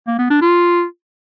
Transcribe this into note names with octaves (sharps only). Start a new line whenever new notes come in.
A#3
B3
D4
F4